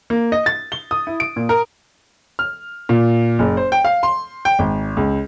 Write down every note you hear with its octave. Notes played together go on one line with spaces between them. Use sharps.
A#3
D#5
A6
G7
D#6
E4
D7
A#2
A#4
F6
A#2
F#1
C5
G5
F5
C6
G5
G#1
C#2